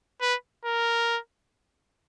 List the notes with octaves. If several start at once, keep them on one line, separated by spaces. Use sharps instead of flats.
B4
A#4